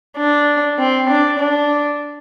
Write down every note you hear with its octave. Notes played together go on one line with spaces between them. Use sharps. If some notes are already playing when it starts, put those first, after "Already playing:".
D4
C4
D4
D4